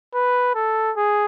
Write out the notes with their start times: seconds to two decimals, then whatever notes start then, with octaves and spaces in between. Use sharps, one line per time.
0.14 B4
0.55 A4
0.97 G#4